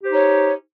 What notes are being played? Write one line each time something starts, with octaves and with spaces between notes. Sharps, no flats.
D#4 G4 C5 C#5